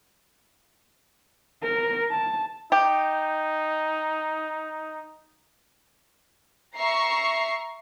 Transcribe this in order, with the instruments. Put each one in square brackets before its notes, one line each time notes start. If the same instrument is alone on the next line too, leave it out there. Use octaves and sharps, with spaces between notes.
[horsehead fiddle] A#4
A5
[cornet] D#4 [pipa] G4
[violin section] E5 A#5 C#6 C7